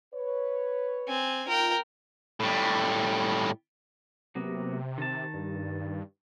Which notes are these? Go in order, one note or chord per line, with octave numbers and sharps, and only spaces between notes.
B4 C#5
C4 G#5
D#4 F4 A#4 G5
A2 G3
C3 F#3 A#3 B3
D#3 A5
G2